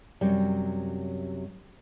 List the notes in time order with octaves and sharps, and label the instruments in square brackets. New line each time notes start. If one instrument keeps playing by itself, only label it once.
[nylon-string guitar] F#2 C3 F#3 G3